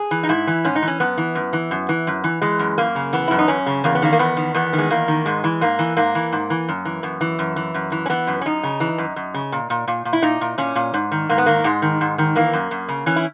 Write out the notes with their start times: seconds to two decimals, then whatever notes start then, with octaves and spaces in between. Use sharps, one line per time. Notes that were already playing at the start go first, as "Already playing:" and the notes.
Already playing: G#4
0.11 E3
0.23 D#4
0.29 G#2 E4
0.47 E3
0.64 G#2 C#4
0.75 D#4
0.82 E3
0.88 C#4
1.00 F#2 B3
1.18 E3
1.35 F#2
1.53 E3
1.71 F#2
1.89 E3
2.07 F#2
2.24 E3
2.42 E3 G#3
2.59 F#2
2.78 F#2 A#3
2.95 C#3
3.13 E3 B3
3.28 F#2 E4
3.38 D#4
3.48 F#2 C#4
3.66 C#3
3.84 E2 A#3
3.95 B3
4.02 D#3 A#3
4.13 A#3
4.19 E2 B3
4.37 D#3
4.54 E2 B3
4.73 D#3
4.78 G#3
4.90 E2 A#3
5.08 D#3
5.26 G#2 G#3
5.44 E3
5.61 G#2 A#3
5.79 E3
5.97 G#2 A#3
6.15 E3
6.32 G#2
6.50 E3
6.68 F#2
6.85 E3
7.03 F#2
7.21 E3
7.39 F#2
7.56 E3
7.74 F#2
7.92 E3
8.06 C#4
8.10 E3 B3
8.27 F#2
8.41 C#4
8.45 F#2 D#4
8.63 C#3
8.80 E3
8.98 F#2
9.16 F#2
9.34 C#3
9.52 A#2
9.70 A#2
9.88 A#2
10.05 A#2
10.13 E4
10.22 A#2 D#4
10.41 A#2
10.58 A#2 C#4
10.76 A#2
10.94 G#2
11.11 D#3
11.29 G#2 A#3
11.38 B3
11.46 D#3 A#3
11.64 G#2 G#3
11.82 D#3
12.01 G#2
12.18 D#3
12.35 E3 A#3
12.53 F#2
12.71 F#2
12.88 C#3
13.06 E3 C#4
13.16 E4